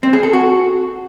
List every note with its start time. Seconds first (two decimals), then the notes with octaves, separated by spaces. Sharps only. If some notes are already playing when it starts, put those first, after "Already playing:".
0.03 C4
0.13 G#4
0.23 A4
0.33 F#4